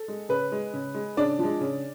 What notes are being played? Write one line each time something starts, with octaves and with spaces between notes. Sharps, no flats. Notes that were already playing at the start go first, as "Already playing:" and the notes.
Already playing: A4
G#3
C#3 B4
G#3
C#3
G#3
C#3 D4 D5
F3 G#3
C#3